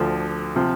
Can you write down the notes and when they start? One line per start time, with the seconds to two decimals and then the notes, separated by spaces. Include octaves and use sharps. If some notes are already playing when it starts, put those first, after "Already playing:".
Already playing: D2 D3 F3
0.56 C3 F3